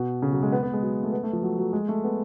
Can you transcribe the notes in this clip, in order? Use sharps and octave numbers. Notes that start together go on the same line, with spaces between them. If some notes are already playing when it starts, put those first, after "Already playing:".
Already playing: B2
C#3
F#3
G#3
B3
B3
G#3
F#3
A3
B3
A3
F3
F#3
F#3
G#3
A3
B3